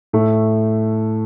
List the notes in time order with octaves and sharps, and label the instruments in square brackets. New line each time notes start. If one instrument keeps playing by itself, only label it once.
[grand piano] A2 A3